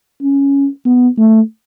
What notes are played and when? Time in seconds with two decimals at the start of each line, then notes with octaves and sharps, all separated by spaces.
0.22 C#4
0.86 B3
1.18 A3